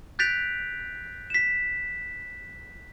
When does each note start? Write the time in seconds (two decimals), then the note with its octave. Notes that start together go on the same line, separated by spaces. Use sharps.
0.19 F#6 G6 A6 B6 D7 F7
1.30 B6 E7